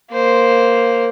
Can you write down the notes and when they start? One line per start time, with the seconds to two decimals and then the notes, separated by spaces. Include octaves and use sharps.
0.11 A#3 C5